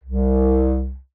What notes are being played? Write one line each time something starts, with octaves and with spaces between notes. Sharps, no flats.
C2